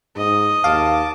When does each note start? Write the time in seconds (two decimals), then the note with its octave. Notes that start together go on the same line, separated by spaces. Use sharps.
0.17 G#2 D#5
0.64 D#2 F5 A5 D6